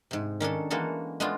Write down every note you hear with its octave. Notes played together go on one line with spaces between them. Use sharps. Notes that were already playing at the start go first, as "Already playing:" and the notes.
G#2 C3
D#3 C#4 D4 A4
E3 G#3 A#3 F#4 A4
G#3 A3 B3 D4 F4